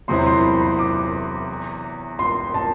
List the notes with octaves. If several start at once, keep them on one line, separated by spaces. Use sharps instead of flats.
E2 C3 F#3 C4 E4 C6
C6
B5
C6
D6
C6
A5